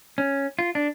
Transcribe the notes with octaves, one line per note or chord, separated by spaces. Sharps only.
C#4
F4
D4